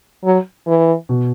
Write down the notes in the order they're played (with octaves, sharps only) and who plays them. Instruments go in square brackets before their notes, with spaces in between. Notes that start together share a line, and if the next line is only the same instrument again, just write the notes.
[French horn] F#3
E3
[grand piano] B2